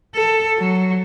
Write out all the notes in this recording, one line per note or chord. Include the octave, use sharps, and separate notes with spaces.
A4
F#3